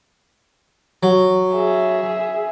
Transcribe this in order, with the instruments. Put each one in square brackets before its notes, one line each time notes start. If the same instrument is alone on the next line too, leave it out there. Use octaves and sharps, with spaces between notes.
[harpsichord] F#3
[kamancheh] G#4 E5